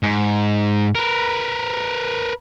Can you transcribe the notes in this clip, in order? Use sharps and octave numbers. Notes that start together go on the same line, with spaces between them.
G#2
A#4 B4